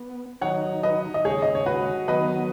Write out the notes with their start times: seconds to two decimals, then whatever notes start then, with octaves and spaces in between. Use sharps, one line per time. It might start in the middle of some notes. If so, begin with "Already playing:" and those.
Already playing: B3
0.41 D#3 F#3 D#4 C#5 F#5
0.83 B4 D#5
1.14 D#5
1.25 D#2 C#3 G#3 G#4 C#5
1.42 D#5
1.55 C#5
1.66 F#4 B4
2.08 D#3 F#3 B3 B4 D#5